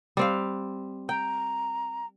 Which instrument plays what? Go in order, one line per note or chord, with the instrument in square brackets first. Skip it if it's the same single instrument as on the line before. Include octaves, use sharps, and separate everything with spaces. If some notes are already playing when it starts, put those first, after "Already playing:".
[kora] G3 C4 F5
[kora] G5 [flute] A#5